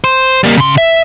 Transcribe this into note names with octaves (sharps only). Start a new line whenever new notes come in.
C5
G3 A#3
C#3 C6
E5